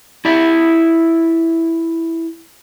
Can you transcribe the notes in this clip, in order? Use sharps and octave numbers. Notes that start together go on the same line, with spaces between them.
E4 D5 E5